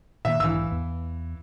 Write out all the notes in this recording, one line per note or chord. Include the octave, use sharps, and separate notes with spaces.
A#2 D#3 A#3 E5
B1 G#2 E3 F5 E6
E2